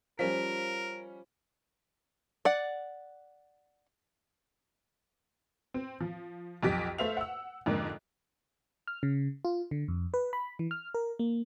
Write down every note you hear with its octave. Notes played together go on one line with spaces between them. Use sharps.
F3 G3 C#4 A#4 B6
D5 F#5
C4
F3
B1 F2 G4 B6
A3 C5 E5 F5 F7
F#5 E6
F2 G#2 D3 A#3 D4
F6
C#3
F4
D3
F2
B4
B5
E3
F6
A#4
A#3